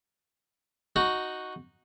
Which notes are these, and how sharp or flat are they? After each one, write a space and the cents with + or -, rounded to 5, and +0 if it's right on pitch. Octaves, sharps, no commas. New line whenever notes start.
D#4 +0 F#4 +0